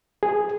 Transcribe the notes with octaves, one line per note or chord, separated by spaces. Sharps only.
G#4